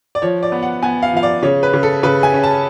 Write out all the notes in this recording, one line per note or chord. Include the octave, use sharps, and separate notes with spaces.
D5
F3 C#5
D5
B3
F#5
B3 G#5
F5
F3 F5
D5
C#3 C#5
B4
C#3
A4
C#3 B4
G#5
C#4
A5